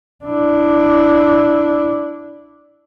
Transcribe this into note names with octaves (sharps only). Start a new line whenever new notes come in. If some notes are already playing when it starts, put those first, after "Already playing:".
D4 E4